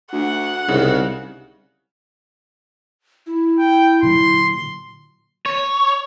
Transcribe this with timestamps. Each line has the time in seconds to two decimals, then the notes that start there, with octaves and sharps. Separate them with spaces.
0.13 D2 F#5
0.68 C2 G#2 C#3
3.26 E4
3.58 G5
4.03 A#2 D3 F#3 C6
5.46 C#5